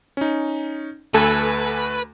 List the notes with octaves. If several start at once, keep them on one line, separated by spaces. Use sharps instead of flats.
C#4 D#4
D2 A3 A4 B4 G#5